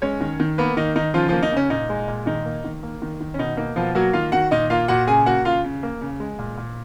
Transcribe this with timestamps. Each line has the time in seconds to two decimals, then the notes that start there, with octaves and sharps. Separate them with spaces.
0.02 G#3 C#4 C#5
0.21 D#3
0.40 D#3
0.58 A#3 B3 B4
0.77 D#3 D#4
0.96 D#3 D#4
1.14 C#3 F3 F4
1.28 F3 A#3 F4
1.42 D#4
1.52 C#3 C#4
1.70 A#2 D#4
1.89 G#3
2.08 A#2
2.26 D#3 D#4
2.45 A#3
2.64 D#3
2.83 A#3
3.02 D#3
3.21 D#3
3.34 C#4
3.39 B2 D#4
3.57 A#3 D#4
3.76 B2 F3 F4
3.95 F#3 A#3 F#4
4.13 D#3 F4 F5
4.32 D#3 F#4 F#5
4.51 A#2 D#4 D#5
4.70 A#3 F4 F5
4.88 A#2 F#4 F#5
5.07 C#3 G#4 G#5
5.26 A#3 F#4 F#5
5.45 C#3 F4 F5
5.64 C#3
5.83 A#3
6.01 C#3
6.20 G#3
6.39 A#2
6.57 A#2